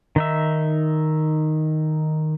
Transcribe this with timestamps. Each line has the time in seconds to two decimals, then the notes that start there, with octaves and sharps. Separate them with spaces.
0.16 D#3 D#4 E5